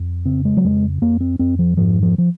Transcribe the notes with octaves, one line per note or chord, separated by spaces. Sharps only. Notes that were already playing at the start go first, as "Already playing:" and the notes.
Already playing: F2
C#3 C4
G#3
F#3
F2 G#3
F2 A#3
C4
F2 C4
F3
G#2 F3
F3
F3